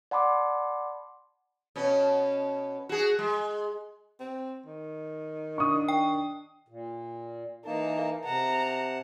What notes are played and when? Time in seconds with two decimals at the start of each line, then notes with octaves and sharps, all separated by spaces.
0.11 D5 F#5 A5 B5 C6 D6
1.76 B2 C#4
2.89 F#4 G#4
3.19 G#3
4.20 C4
4.66 D#3
5.58 D4 C#6 D#6
5.89 G5
6.68 A#2
7.66 E3 A#3 D#4 A5
8.25 C3 F#5 A5 A#5